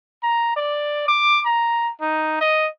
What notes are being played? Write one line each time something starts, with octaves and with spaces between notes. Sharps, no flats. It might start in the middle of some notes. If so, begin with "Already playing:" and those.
A#5
D5
D6
A#5
D#4
D#5